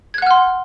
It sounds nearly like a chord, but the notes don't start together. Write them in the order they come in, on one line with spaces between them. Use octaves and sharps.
G#6 F#6 F#5 F6 C6